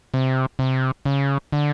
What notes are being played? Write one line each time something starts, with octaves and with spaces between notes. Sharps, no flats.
C3
C3
C#3
D3